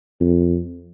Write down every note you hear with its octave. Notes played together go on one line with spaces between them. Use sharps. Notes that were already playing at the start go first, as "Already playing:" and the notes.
F2